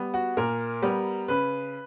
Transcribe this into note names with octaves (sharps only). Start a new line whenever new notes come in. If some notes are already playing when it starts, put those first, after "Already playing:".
Already playing: G3 B3
F#4
A#2 A#4
G3 B3
C#3 B4